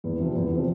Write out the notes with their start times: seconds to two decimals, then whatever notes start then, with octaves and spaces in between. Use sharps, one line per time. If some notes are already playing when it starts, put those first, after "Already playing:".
0.04 E2
0.19 C3 F3 C4
0.35 E2
0.51 C3 F3 C4